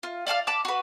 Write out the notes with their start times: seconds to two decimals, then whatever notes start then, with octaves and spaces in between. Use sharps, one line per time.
0.03 F4
0.27 D5 F5 A5 F6
0.47 A5 B5 D6 F#6
0.65 F#4 B4